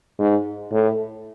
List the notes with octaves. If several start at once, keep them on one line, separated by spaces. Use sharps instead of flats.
G#2
A2